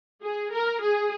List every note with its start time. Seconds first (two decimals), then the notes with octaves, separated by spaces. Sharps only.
0.22 G#4
0.52 A#4
0.81 G#4